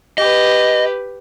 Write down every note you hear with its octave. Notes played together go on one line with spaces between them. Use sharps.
G4 B4 D#5